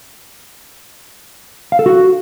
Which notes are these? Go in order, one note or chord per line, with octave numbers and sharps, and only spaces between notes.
F5
A4
F#4